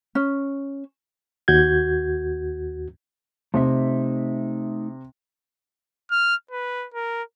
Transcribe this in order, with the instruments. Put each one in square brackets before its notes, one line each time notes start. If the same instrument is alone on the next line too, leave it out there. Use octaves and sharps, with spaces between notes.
[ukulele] C#4
[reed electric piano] D#2 F#4 G6 G#6
[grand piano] C3 [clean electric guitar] A3 D#4 E5
[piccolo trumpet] F6
B4
A#4